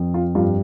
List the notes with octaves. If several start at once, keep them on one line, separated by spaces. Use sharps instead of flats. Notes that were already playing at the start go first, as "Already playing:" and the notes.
Already playing: F2
F4
G2 F4